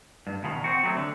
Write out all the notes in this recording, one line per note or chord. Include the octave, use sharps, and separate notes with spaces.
G2
E2 B2 D#3
C4 F#4
F#3 A3 B3 C4
D3